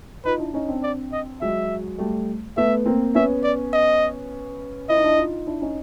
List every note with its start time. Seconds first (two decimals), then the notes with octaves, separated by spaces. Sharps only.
0.25 D#4 F4 B4
0.39 D4 E4
0.54 C#4 D#4
0.69 C4 D4
0.83 D5
1.12 D#5
1.41 F#3 G#3 E5
1.98 G3 A3
2.57 A3 B3 E5
2.85 A#3 C4
3.15 B3 C#4 E5
3.44 D5
3.73 D#5
4.89 E4 D#5
4.97 D#4
5.04 D4 E4
5.18 D#4 F4
5.47 D4 E4
5.61 C#4 D#4